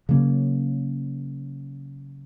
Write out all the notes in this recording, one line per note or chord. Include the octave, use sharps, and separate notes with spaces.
C#3 F#3 A#3 C#4